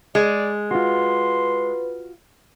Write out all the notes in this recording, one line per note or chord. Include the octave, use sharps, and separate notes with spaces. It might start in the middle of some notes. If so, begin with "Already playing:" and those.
G#3 D5
F4 F#4 B4 C6